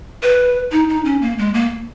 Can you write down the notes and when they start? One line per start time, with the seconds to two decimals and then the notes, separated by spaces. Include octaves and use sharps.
0.23 B4
0.72 D#4
0.89 D#4
1.05 C#4
1.22 A#3
1.38 G#3
1.54 A#3